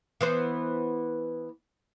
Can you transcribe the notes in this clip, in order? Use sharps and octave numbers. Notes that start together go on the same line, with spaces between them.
E3 B3 C5